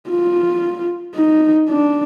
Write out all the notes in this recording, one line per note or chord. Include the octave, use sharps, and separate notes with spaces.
F4
D#4
D4